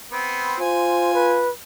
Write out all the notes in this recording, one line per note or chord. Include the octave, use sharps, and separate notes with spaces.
B3 C4
F4 C5 G#5
B4